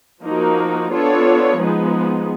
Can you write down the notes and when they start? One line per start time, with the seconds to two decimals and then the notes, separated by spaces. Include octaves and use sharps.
0.24 F3 A#3 D#4 F#4 A#4
0.92 B3 D4 F4 A4 C#5
1.59 F3 G#3 B3 D#4 G#4